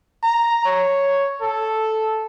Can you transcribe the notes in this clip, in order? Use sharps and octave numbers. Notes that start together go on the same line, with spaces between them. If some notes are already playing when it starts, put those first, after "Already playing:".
A#5
C#5
A4